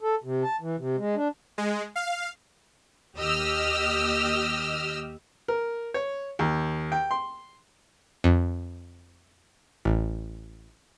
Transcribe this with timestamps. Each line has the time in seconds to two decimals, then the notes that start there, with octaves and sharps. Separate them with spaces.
0.01 A4
0.24 C3
0.43 A5
0.61 E3
0.79 C3
0.97 G#3
1.15 D4
1.58 G#3
1.96 F5
3.16 D#2 G4 D#5 E6 F6
5.48 A#4
5.94 C#5
6.39 D#2
6.92 G5
7.11 C6
8.24 F2
9.85 A1